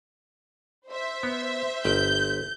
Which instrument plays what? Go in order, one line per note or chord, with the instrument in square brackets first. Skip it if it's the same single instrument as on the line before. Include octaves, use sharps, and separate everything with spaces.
[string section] C5 E5
[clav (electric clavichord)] B3
[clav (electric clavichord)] G1 G5 [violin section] G6